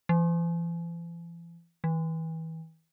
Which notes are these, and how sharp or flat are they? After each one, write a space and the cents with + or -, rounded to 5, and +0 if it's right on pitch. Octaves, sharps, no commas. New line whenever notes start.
E3 +40
E3 -35